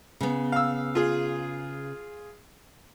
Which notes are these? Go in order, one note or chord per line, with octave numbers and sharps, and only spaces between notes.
C#3 B3
F5 E6
F4 G#4